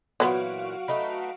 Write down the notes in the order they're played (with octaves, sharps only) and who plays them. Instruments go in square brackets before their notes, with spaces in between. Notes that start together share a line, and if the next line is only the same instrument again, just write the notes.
[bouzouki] A#2 E3 [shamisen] F#3 B3 F4 [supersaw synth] F#4 F5 D7
[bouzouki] A3 D#4 B4